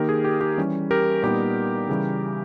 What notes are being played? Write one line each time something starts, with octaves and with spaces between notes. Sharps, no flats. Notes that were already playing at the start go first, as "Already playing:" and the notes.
Already playing: D#3 A#3 D#4 G4 A#4
G#4
G4
G4
E3 G3 C#4
G4 A#4
A#2 G3 B3 D#4 G4 A#4
C#3 E3 G3 C#4